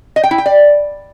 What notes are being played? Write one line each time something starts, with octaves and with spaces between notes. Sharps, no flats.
D#5
G5
E4
G5
D5